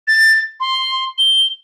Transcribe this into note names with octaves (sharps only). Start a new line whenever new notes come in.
A6
C6
G7